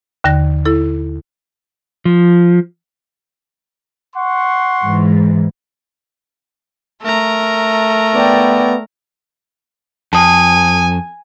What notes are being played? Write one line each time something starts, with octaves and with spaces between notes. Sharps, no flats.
D#2 D3 A#6
E4 A4
F3
F#5 C6 C#6
G#2 E3
A3 A#4 A#5
B3 D5 G5
F2 G#5 A5 D#6